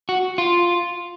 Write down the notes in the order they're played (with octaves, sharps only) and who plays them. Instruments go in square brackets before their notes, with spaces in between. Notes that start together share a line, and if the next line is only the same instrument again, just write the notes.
[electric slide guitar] F#4
F4